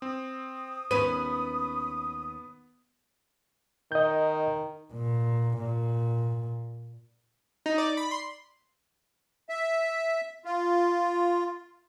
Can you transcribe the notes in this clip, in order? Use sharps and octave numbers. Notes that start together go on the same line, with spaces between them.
C4 D#6
D#2 B3 C#4 B4 B5 D#7
D#3 D#5 G6
A#2
A#2
D#4
D5
B5
C6
E5
F4